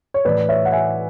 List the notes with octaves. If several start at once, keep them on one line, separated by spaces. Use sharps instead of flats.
C#5
A2 E3 B4 D5
C#5 E5
F#5
E5 G#5